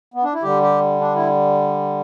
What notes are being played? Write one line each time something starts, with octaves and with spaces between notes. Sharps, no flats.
B3
D4
E4
D3 G3 G4
G4
D4
E4